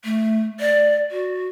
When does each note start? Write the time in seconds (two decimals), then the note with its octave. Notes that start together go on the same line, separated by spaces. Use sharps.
0.05 A3
0.60 D5
1.11 F#4